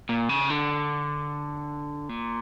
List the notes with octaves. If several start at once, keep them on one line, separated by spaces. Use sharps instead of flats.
A#2
C#3
D3
A#2